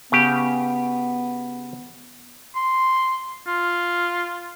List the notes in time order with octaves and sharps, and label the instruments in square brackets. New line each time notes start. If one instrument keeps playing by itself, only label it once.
[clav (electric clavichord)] C#3 G4 [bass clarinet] B3
[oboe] C6
F4